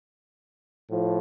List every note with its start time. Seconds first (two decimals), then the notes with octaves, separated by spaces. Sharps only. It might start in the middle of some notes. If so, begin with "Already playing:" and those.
0.89 A2 F3